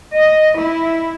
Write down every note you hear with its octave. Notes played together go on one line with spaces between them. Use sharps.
D#5
E4